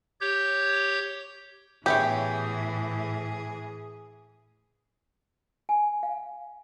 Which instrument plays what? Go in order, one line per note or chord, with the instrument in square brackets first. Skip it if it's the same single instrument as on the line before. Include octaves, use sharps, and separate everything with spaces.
[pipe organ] G4 C#5 G6
[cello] A2 E3 [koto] B3 E4 C#5 [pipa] G4 [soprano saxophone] G#4
[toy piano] G#5
F5